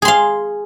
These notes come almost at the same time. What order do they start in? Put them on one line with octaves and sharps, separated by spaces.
G#4 C6 F5